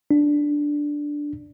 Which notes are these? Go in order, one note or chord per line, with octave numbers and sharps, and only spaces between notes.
D4